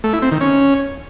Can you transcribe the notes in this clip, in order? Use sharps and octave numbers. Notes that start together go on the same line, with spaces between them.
A3
E4
C4
D#3
C#4